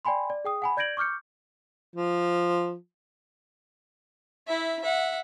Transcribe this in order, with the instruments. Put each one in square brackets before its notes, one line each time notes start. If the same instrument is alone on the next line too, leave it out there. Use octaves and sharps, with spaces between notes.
[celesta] D5 G5 G#5 B5 C6
D5
G#4 G5 D#6
F#5 G#5 B5
D5 G6 G#6 A#6 D7 F#7
C#6 D6 F6 G6 C#7
[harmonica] F3
[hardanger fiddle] E4 E5
E5 F#5